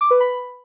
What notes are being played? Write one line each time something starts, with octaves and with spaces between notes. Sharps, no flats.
D6
B4
B5